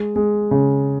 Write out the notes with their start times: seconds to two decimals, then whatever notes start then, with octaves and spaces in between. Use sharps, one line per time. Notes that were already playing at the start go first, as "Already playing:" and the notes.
Already playing: G#3
0.16 G#3
0.51 C#3